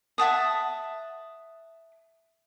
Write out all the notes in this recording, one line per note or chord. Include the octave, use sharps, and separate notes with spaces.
E5 F#5 A5 D#6